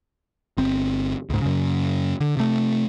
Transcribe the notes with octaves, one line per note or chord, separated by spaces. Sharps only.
G1 C4
C#2 G#2
F#2 C#3
D3
C3 A3